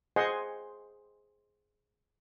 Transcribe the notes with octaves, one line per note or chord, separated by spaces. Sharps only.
G#4 C5 D#5 F#5 G#5 C6